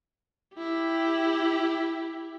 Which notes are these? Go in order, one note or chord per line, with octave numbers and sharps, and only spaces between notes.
E4 G4